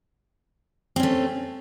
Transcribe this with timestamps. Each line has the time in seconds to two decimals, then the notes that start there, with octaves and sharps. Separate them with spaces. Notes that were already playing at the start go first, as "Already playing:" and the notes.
0.96 C4
1.00 C#4
1.03 A3